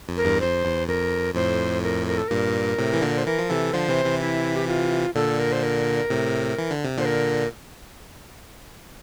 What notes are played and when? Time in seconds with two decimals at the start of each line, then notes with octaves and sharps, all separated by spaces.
0.09 F2
0.17 A#4
0.25 E2 G2
0.41 F2 C5
0.65 E2
0.88 F2 A#4
1.35 F2 A2 C5
1.83 A#4
2.07 A#4
2.18 A4
2.28 G2 A#2 A#4
2.78 A2 C3
2.93 E3
3.02 A#2 D3
3.18 C5
3.26 E3 A#4
3.38 F3
3.50 C3 E3 A4
3.73 D3 F3 C5
3.89 C3 E3
4.05 C3 E3
4.21 E4
4.56 G4
4.68 F4
5.15 A#2 D3 A4
5.39 A#4
5.52 C5
5.63 A#4
6.10 A2 C3
6.58 E3
6.71 D3
6.84 C3
6.97 A#2 D3 C5
7.05 A#4